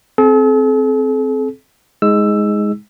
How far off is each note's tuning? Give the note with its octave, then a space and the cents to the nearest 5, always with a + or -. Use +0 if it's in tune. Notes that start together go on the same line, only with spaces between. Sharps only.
C4 +0 A4 -45
G#3 +0 D#4 +30 E6 +10